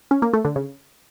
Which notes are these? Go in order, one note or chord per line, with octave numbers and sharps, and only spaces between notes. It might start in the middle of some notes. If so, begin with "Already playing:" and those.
C#4
A#3
A3
D3
C#3